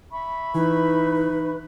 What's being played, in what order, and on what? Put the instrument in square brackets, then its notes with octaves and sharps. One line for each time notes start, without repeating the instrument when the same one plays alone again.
[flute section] E5 B5 C#6
[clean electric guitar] E3 [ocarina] D#4 [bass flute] B4